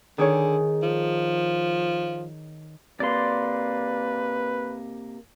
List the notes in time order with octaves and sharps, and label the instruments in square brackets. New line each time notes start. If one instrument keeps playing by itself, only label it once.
[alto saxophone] D3 [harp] D#3 G#4 C#5
[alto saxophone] F3
[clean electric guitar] C3 A#3 [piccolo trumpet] B4 [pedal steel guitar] D5 C6